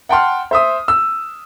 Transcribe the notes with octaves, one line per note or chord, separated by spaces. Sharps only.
F#5 G5 A5 C6 F6
C5 E5 D#6
E6